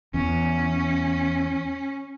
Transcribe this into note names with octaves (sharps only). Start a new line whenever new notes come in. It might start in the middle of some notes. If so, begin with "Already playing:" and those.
E2 C#4